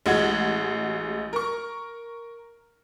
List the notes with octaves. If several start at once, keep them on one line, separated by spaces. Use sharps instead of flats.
A1 G#3 F#4 F#5 G#6
A#4 C#6